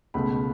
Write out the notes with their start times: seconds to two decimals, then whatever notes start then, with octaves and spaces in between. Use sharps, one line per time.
0.14 C#2 B2 A3 B5